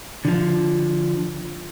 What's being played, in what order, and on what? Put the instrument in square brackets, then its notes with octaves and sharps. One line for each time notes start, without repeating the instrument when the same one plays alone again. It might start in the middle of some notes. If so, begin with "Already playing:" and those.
[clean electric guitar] D3 F3